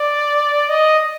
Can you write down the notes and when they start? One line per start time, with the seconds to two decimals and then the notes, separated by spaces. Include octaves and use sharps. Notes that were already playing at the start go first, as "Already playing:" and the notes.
Already playing: D5
0.69 D#5